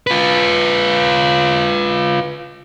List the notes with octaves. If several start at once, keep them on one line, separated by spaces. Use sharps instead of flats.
F4 B4